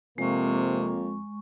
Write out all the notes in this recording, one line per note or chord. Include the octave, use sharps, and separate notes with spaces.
F2 C3 G#3 A#3 C#6